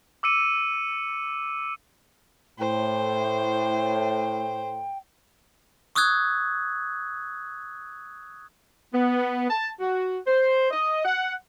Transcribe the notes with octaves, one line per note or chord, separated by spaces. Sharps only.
D6 E6 C#7 D#7
A2 C5 G5
C#6 D#6 E6 F#6 G#6
B3
A5
F#4
C5
D#5
F#5